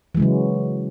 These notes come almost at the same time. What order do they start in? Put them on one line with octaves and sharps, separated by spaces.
E3 G#3 C#3 F#3